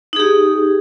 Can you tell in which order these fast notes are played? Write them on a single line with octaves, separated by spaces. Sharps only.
D#4 G#4 G4